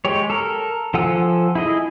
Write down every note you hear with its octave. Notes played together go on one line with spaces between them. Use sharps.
G#3 G4 C#5
A4 A#4
F3 A4 F#5 G#5 E6
E4 G#4 D#5